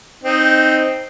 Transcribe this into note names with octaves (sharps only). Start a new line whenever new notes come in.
C4 D#4